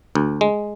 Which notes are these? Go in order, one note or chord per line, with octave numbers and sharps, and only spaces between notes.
D2
G#3